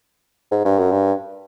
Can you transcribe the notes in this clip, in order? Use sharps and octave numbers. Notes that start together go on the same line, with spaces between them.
G#2
G2
F#2
G2